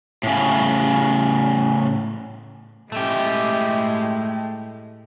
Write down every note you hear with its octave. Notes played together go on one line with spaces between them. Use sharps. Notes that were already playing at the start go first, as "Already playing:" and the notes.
A2 C#3
A2 G#3 A3 G4